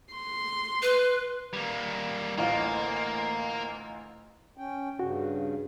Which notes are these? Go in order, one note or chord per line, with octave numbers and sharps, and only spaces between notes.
C6
B4
G3 A#3
A1 D2 A#3 F4
C#4 G5
G2 C#3 F#4